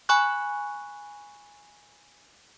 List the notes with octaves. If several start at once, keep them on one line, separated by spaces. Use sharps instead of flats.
G#5 B5 C#6 F#6